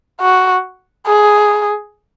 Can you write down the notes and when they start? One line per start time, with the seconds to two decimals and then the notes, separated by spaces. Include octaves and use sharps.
0.21 F#4
1.06 G#4